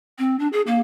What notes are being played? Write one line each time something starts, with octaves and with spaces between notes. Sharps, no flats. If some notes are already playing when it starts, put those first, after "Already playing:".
C4
D4
G#4
A#3